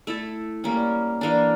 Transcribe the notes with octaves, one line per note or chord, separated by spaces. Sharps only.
A3 E4 A4
G3 A#3 C#4
E3 A#3 D4